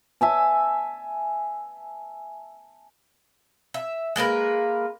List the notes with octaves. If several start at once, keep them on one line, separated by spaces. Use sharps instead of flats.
E5 G#5 A5
E5
G#3 A#3 A#4 B4